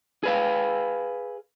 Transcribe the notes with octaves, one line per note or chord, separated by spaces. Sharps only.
G#4 B4 F5